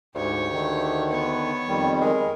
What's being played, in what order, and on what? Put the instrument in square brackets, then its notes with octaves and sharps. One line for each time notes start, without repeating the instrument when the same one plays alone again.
[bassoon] D2 [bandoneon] G#2 [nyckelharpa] G4 C#5
[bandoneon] D3 D#3
[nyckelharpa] B3 C#5
[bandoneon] F2 D#3 G3
[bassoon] G#3 [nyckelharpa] A#4